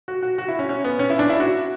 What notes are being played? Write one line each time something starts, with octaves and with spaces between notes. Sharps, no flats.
F#4
F#4
F#4
E4
C#4
C#4
B3
C#4
E4
D4
E4
F#4